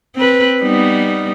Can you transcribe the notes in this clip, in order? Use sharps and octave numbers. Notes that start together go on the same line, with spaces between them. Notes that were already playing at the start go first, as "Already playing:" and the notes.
C4 B4
G3 B3 D#4